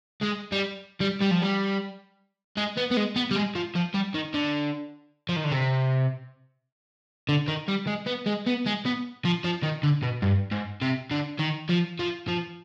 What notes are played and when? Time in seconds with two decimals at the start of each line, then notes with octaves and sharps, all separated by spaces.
0.21 G#3
0.52 G3
1.00 G3
1.21 G3
1.31 F3
1.42 G3
2.57 G#3
2.77 B3
2.91 B3
2.97 G#3
3.16 B3
3.31 G3
3.36 G#3
3.55 F3
3.76 F3
3.94 G3
4.15 D#3
4.34 D3
5.29 F3
5.36 D#3
5.44 D3
5.52 C3
7.29 D3
7.48 D#3
7.68 G3
7.87 G#3
8.06 B3
8.26 G#3
8.46 B3
8.66 G#3
8.85 B3
9.25 F3
9.44 F3
9.63 D#3
9.83 D3
10.03 B2
10.22 G2
10.52 G#2
10.82 C3
11.11 D3
11.39 D#3
11.69 F3
11.99 F3
12.28 F3